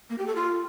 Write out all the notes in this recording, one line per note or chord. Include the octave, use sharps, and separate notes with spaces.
A#3
G4
A4
F4